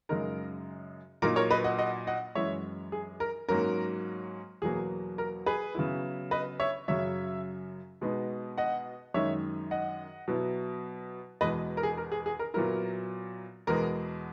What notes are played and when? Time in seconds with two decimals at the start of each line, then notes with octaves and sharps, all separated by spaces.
0.09 F#2 C#3 G#3 D#4 A#4
1.22 A#2 F#3 A#3 D#4 A#4
1.36 A#4 C#5
1.50 B4 D#5
1.64 D#5 F#5
1.78 D#5 F#5
2.07 D#5 F#5
2.35 F#2 E3 G#3 C#5 E5
2.92 G#4
3.20 A#4
3.48 G#2 F#3 A#3 C#4 A#4
4.62 E2 B2 F#3 A#3 G#4
5.18 A#4
5.46 G#4 B4
5.75 C#3 F#3 B3 E4
6.31 B4 D#5
6.60 C#5 E5
6.88 F#2 C#3 F#3 C#5 E5
8.01 B2 G#3 B3 D#4
8.58 D#5 F#5
9.14 F#2 D#3 G#3 D#4 C#5 E5
9.71 D#5 F#5
10.28 B2 F#3 B3 E4
11.41 E2 B2 G#3 B4 D#5
11.77 A#4
11.83 G#4
11.97 A#4
12.12 G#4
12.26 G#4
12.39 A#4
12.54 A#2 F#3 B3 E4 A#4
13.67 E2 B2 G#3 B3 A#4